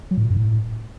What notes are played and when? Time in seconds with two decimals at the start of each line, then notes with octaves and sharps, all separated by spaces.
0.11 F#3
0.17 A2
0.24 A#2
0.30 G2
0.37 A2